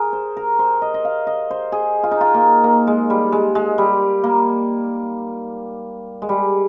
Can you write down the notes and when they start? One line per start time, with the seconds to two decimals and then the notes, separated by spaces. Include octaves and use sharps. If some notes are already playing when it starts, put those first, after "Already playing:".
Already playing: G#4 A#4
0.13 C5
0.37 A#4
0.59 C5
0.82 D#5
0.94 D#5
1.05 F5
1.27 D#5
1.51 C5
1.72 G#4
2.03 F4
2.11 D#4
2.21 F4
2.34 A#3
2.64 A#3
2.87 G#3
3.10 G3
3.32 G#3
3.55 G#3
3.78 G3
4.24 A#3
6.22 G#3
6.29 G3